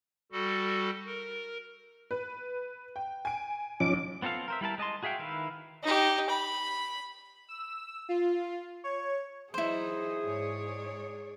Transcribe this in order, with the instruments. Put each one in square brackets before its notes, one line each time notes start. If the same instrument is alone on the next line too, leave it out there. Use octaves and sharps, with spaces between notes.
[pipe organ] G3 F#4 A4
A#4
[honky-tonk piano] B4
G5
G#5 D7
[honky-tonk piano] B1 [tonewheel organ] F3 C#4 D6
[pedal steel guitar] B3 C4 F4 A4 F5
A#4 C5 E5
G3 E4 A#4 A5
G#3 D#5 A5 C6
F#4 G#4 E5 F5 G5
D#3 E4 B4 E5 F5
[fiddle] D#4 G4
B5
[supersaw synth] E6
F4
C#5
[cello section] E3 F#3 D#4 [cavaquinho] E4 C5 [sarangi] G#4
[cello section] G#2 C#5 D5